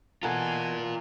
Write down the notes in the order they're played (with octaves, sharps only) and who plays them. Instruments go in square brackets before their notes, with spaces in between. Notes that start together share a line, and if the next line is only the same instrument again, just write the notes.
[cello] B2 E3 [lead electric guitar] F4 A#4 [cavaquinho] A4 F#5 [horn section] G#5